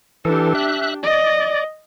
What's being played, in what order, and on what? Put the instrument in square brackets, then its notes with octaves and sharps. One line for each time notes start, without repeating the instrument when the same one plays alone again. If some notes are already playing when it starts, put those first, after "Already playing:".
[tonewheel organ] E3 A4 [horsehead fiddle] D4 G4
[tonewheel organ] E5 F#6
[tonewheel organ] D5 [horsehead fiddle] D#5